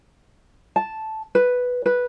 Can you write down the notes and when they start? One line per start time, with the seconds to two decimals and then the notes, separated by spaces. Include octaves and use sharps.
0.76 A5
1.35 B4
1.86 B4